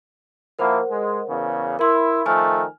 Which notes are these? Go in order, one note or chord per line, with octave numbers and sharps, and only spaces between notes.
F3 A#3 E4 A#4 C5 F#5
G#3
E2 C#3
E4 A#4 C6
D#3 F3 A3 G#5 F6